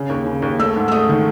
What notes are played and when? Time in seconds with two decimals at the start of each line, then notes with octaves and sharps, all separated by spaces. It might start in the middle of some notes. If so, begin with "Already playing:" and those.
Already playing: C#3
0.09 D#2
0.26 C#3
0.42 D#2
0.59 A3 E6
0.76 G#2
0.88 E6
0.92 A3 D#6
1.09 D#3